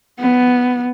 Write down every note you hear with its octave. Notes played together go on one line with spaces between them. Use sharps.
B3